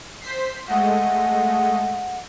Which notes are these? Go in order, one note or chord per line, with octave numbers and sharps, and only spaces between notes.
C5 B6 C7
G#3 A3 D#5 F#5